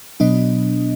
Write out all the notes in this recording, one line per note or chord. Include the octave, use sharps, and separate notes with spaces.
B2 F#3 B3 D4 D#5